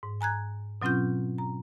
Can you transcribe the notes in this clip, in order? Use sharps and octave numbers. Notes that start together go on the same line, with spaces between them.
G#2
G#5 A#5 F#6 G#6
B2 F#3 C4 C#4 F4 G6
A#5